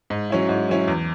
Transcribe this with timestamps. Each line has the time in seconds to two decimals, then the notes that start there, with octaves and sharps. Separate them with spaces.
0.10 G#2
0.30 F#3 C#4 E4
0.49 G#2
0.69 F#3 C#4 E4
0.87 E2